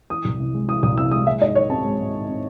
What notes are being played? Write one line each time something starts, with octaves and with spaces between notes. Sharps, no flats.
E3 D#6
C2
C3
G#3
E3 D#6
C2 D#6
C3 E6
G#3 D#6
G#3 E5
G#2 D#5
D#3 C#5
C4 A5
G#3
G#2
D#3
C4